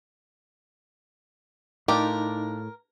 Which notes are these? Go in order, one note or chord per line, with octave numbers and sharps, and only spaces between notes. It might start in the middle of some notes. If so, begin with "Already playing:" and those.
A2 D4 D#4 F4 G4 A#4